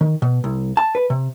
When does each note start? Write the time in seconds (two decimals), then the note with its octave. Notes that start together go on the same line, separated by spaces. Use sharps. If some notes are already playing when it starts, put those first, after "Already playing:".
0.01 D#3
0.22 B2
0.44 C2
0.77 A5
0.95 B4
1.10 C3